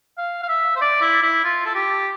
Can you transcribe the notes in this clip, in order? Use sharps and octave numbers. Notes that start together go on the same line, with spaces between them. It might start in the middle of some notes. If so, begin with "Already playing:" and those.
F5
F5
E5
C5
D5
E4
E4
F4
A4
G4